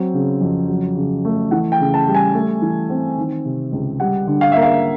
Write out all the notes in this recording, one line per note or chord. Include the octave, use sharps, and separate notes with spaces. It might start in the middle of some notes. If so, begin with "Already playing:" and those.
Already playing: F#3 C4
C#3
F2
F#3
C#3
A3
E3 F#5
G5
C#3
A5
G3
G#5
A3
E3
C4
D#3
C3
C#2
G3 F#5
D3
F5
A#3 E5
F5